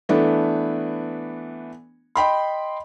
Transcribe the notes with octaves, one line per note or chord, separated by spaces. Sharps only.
E3 A3 B3 D4
D#5 G5 B5 C6